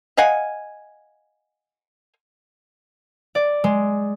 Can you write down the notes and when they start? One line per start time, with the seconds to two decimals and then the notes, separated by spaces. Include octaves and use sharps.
0.17 D#5 F5 F#5 G#5
3.35 D5
3.64 G#3